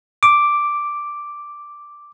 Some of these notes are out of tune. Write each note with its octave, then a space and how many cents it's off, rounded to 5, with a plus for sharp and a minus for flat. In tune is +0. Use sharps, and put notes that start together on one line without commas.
D6 +0